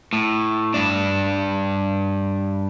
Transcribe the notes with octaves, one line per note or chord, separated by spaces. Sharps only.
A2
G2 D4